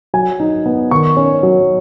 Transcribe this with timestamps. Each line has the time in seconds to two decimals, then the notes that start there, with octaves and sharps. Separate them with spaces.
0.14 F#3 G#5
0.40 D#4
0.66 B3
0.91 D#3 C#6
1.17 C#4
1.43 F#3